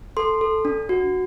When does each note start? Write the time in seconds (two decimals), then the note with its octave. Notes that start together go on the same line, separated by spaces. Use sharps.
0.17 A4 C6
0.41 A4
0.65 D4
0.89 F#4